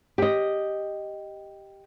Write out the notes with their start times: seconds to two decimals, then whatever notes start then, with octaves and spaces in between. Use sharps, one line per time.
0.18 G4 D#5